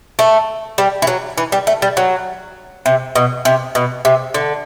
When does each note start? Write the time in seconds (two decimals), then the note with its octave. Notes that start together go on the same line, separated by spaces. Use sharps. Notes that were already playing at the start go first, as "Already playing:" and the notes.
0.19 A3
0.78 G3
1.02 E3
1.07 F#3
1.38 E3
1.52 G3
1.67 A3
1.82 G3
1.97 F#3
2.86 C3
3.16 B2
3.45 C3
3.75 B2
4.05 C3
4.34 D3